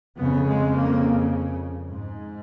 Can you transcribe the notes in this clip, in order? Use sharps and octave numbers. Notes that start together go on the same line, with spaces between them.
F2 C#3 B3
G#3
A#3
G#2